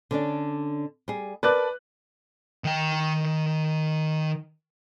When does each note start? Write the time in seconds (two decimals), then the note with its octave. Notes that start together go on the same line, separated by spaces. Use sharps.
0.11 D3 C#4 D4
1.08 G3 G#4
1.43 A#4 B4 D5 A5 F#6
2.64 D#3 G5